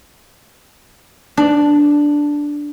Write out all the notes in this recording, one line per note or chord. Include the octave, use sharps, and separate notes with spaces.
D4